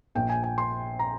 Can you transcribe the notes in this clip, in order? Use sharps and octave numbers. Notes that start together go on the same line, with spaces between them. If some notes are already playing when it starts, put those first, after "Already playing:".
A#1 A#2 G5
G#5
G#5
C6
A#5